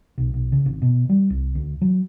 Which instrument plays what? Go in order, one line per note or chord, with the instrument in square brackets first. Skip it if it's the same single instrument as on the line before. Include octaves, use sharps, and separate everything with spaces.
[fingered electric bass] B1
B1
C#3
G#1
B2
G3
C2
D2
F#3